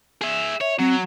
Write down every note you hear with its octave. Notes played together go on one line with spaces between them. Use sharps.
G#4 E5
C#5 E5
F#3 C4